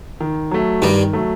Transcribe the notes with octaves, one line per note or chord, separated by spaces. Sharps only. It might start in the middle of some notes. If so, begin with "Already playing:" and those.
D#3
F#3 A3
G2 D#3 G3
F#3 A3